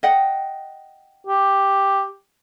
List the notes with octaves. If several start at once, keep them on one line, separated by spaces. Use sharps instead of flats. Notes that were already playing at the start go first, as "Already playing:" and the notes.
D#5 F#5 G5
G4